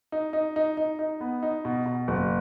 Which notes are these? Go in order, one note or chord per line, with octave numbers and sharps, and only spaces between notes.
D#4
D#4
D#4
D#4
D#4
B3
D#4
B2
B2
F#1